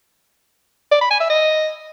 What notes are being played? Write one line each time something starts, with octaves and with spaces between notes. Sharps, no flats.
D5
B5
G#5
E5
D#5